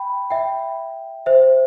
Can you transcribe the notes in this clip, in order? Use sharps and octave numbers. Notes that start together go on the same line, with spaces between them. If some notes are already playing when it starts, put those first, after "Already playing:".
Already playing: G5 B5
E5 G5
C5 E5